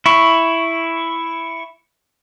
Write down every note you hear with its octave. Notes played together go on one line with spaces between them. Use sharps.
E4 C#6